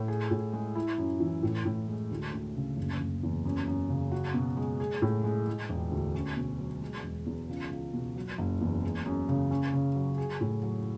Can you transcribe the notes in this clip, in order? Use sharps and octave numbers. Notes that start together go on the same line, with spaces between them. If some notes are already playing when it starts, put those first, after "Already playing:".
Already playing: A2
G#4
A2
G#3
E4
F#2
E3
A2
A2
G#3
D2
D2
C#3
F#1
F#1
E2
F#2
F#2
C#3
F#4
B2
G#3
G#4
A2
G#3
G#3
E1
D2
C#4
B2
F#3
G#3
E1
E2
C#2
C#2
B2
F#3
F#1
E2
G#3
F#2
C#3
C#4
C#3
F#3
G#4
A2
F#3